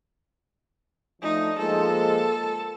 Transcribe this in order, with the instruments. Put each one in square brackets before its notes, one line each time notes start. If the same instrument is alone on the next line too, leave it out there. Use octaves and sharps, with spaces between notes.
[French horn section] F3 A3 D4 [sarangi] D#4
[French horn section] F3 G#3 A#3 [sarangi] A4